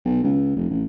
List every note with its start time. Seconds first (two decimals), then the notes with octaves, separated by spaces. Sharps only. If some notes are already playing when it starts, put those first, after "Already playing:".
0.05 B1
0.24 C#2
0.56 F1
0.70 A1